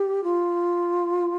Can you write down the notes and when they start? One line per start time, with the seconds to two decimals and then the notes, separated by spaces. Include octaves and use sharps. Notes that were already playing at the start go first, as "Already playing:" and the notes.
Already playing: G4
0.24 F4